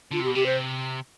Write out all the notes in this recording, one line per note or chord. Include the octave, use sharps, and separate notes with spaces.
D3 F4
C3
G4
B2
C3 G4
C5